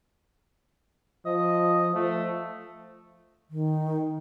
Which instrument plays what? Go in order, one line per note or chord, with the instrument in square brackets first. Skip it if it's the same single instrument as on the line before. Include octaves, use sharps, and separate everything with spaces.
[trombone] F3 [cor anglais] D#5
[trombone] F3 [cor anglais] A3
[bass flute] D#3